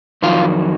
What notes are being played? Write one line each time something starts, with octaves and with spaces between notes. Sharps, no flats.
F2 D#3 F#3 F4